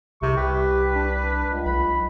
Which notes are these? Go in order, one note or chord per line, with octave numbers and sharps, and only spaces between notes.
C2 C3 C#6
G4 B4
D4
C#2
B1 B5